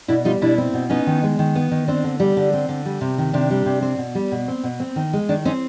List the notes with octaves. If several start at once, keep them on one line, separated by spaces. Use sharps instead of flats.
B2 D4 E4
G3 D#4 F4
B2 D4 E4
C4
B2
B3 C#4 D#4
D#3
G#3
D#3
B3
D#3
C4 D4
D3
G3
D3 D4
C4
D3
G3
C3
D#3
C3 D4
G3
C3
C4
B2
G3
B2
C4
B2
C4
D#3
G#3
D#3 D4
C4 C#4 D#4